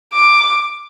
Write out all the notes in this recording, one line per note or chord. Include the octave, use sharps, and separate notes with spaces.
D6